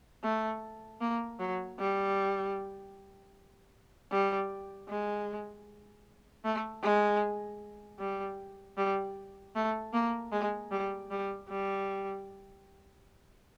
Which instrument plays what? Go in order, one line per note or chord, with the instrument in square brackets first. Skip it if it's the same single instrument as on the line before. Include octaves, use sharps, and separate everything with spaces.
[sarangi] A3
A#3
F#3
G3
G3
G#3
A3
G#3
G3
G3
A3
A#3
G#3
G3
G3
G3